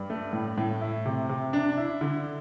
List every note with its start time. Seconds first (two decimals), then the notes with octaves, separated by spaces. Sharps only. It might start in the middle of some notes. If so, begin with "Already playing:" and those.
Already playing: G2
0.10 A3
0.33 A2
0.58 A2
0.81 E4
1.05 C3
1.29 C3
1.53 D4
1.77 E4
2.01 D3